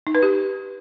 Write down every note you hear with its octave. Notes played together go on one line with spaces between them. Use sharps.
D#4
B4
G4